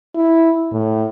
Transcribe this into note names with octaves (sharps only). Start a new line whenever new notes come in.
E4
A2